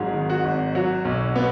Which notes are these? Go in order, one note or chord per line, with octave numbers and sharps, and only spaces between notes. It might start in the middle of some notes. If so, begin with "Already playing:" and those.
Already playing: G#1 G#2 F#3 G#4
D#3
F#4
G#1
F#3 F#4
B1
B3